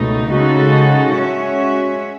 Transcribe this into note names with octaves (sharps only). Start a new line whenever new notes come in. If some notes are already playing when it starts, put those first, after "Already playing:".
Already playing: C#2 B2 A3 D#4
C#3 G#3 D#4 F#4 A4
G#3 C#4 F#4 C#5 E5